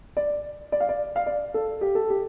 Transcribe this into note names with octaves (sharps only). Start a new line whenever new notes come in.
D5
D5
F5
D5
F5
D5
A4
G4
A4
G4